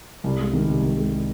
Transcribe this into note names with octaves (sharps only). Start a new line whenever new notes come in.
C2
G#3
D#3
C3
C2
G#3